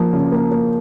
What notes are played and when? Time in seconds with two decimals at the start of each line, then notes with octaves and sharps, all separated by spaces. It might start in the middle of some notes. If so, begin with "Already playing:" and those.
Already playing: F3 A#3
0.13 C#3
0.32 A#3
0.51 A#3